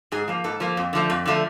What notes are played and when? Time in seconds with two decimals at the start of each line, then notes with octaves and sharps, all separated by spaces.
0.12 G#2 G#4
0.28 F3 A#3
0.44 G#2 A4
0.60 F3 A#3
0.77 F2
0.93 D3 F3 A3
1.10 F2
1.26 D3 F3 A3